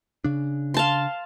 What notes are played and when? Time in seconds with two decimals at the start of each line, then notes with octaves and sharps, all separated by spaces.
0.24 C#3 D4
0.74 F5 A5 C6